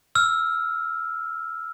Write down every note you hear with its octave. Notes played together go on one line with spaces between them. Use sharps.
E6 F6